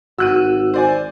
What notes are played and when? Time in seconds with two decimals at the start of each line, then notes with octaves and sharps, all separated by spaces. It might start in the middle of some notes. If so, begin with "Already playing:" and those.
0.18 G#1 F#4 E6 F#6 D#7
0.74 C5 D5 G#5